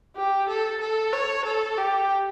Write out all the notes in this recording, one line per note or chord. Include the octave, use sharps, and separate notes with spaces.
G4
A4
A4
C#5
A4
G4